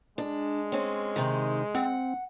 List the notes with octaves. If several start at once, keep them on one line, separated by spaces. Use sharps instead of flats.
G#3 D4
C4 C#4
C3 D#3
C4 F#5